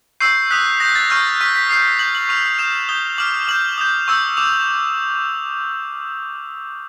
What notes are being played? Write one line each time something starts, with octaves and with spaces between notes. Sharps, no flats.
C#6 E6 G6 C7
D#6 F#6 B6
D#6 G6 A#6
A6
C#6 F6 G6
C#6 F6 B6
B6
D#6 G6 C7
D#6 G6 F#7
F#7
C#6 F6 F7
D#6 G6 E7
D#6 G6 G7
D6 F6 F#7
D6 G6 F#7
D#6 G6
C#6 E6 G6
D6 F7